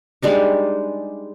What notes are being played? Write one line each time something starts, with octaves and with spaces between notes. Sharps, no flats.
G3 G#3 D4 D#4